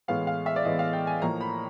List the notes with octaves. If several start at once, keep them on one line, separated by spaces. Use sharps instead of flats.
A2 E3 G#3 B3 F5
F5
E5
D5
A2 E3 G#3 B3 D#5
F5
G5
G#5
A2 F3 A#3 A#5
B5